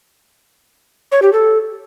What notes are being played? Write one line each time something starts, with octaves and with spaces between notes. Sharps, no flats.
C#5
G4
A4